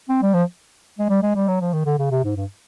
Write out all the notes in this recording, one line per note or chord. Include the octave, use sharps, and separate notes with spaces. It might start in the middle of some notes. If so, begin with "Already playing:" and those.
C4
G3
F3
G#3
G3
G#3
G3
F#3
F3
D#3
D3
C#3
C3
G#2
G2